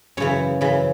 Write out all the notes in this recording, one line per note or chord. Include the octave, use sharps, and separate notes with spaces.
F#2 C#3 E3 C#5
F#2 C#3 E3